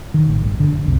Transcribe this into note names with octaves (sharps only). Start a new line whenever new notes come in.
D#3
A1
G1
D3
F#1
C2